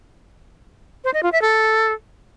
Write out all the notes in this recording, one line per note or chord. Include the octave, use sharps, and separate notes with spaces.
C5
D#5
F4
E5
A4